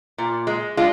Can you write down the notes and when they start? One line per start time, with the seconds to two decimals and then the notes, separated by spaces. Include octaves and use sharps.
0.18 A#2
0.47 G#3
0.77 G#3 D4 F4